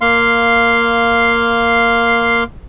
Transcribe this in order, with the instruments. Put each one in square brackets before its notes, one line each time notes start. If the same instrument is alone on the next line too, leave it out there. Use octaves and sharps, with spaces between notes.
[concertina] A#3 F5 C6